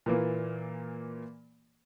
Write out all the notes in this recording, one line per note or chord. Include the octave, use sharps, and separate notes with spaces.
A#2 E3 A#3